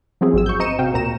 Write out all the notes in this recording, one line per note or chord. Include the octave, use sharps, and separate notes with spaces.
F3 F#3 C4 E4 G#4
G#1 F#3 E6
C#6 G6
C4 D#5 A#5 C#7 D#7 E7
C3 F#4 F5 G5
D2 A#2 A#5 E7